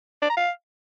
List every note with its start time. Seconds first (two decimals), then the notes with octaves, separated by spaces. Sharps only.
0.22 D5
0.29 A#5
0.37 F5